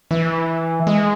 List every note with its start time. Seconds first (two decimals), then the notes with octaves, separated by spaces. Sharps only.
0.11 E3
0.87 G#3